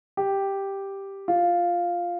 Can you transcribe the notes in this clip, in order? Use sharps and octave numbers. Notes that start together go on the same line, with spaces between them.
G4
F4